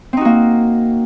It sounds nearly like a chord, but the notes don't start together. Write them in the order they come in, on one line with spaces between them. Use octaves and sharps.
C4 D#4 F#4 A#3